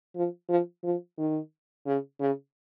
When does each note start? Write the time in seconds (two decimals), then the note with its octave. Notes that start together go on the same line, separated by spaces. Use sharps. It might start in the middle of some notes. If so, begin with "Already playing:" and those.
0.16 F3
0.49 F3
0.84 F3
1.18 D#3
1.86 C#3
2.20 C#3